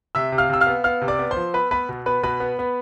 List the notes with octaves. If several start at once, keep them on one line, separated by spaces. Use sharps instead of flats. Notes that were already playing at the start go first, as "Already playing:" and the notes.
C3 E5 E6
C3
F5 F6
C3 E6
F5 F6
B3
B3 F5 F6
C3
D5 D6
B3
C5 C6
F3
B3 B4 B5
B3 B4 B5
B2
B3 B4 B5
B2 B4 B5
B3
B3